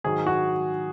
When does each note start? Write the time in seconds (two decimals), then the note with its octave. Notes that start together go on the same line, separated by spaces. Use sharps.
0.04 G#2 D#3 F#3 G#4
0.26 F#4